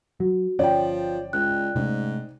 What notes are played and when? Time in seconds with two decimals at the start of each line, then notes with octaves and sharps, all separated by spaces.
0.20 F#3 F#4
0.59 G1 F3 C#4 C#5 D5 G5
1.33 C#2 F#6
1.75 G#2 C3 A3 C#4